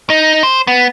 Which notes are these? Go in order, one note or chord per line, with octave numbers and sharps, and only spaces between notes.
D#4
C5
B3